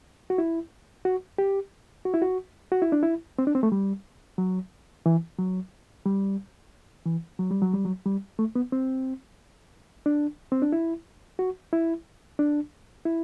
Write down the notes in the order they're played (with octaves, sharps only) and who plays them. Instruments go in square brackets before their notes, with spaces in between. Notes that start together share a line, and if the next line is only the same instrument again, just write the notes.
[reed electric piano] F#4
E4
F#4
G4
F#4
E4
F#4
F#4
E4
D4
E4
C4
D4
C4
A3
G3
F#3
E3
F#3
G3
E3
F#3
G3
F#3
G3
F#3
G3
A3
B3
C4
D4
C4
D4
E4
F#4
E4
D4
E4